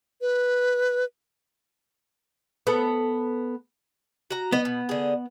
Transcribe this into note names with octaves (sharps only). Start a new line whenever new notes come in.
B4
B3 A4
F#4 A#5
B3 D#5
B2
D3 G#4